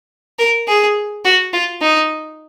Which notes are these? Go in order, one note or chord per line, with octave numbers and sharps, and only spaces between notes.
A#4
G#4
F#4
F4
D#4